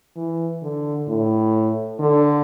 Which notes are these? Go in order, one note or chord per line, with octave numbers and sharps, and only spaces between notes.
E3
D3
A2
D3